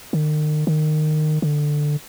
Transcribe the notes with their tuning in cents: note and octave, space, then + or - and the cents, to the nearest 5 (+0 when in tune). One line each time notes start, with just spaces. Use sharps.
D#3 -40
D#3 -20
D3 +10